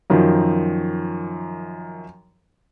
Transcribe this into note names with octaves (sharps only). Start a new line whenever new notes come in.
F#2 D#3 F3